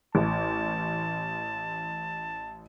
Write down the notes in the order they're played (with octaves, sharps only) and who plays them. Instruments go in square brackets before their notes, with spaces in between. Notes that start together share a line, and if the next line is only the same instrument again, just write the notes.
[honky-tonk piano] A1 [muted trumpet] A5